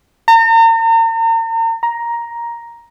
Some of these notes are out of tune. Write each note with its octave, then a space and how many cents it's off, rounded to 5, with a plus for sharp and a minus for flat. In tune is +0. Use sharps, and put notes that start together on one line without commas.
A#5 -40
A#5 +10